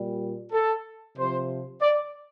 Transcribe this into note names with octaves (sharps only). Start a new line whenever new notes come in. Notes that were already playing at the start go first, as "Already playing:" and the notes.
Already playing: A#2 G3
A4
C3 F3 C5
D5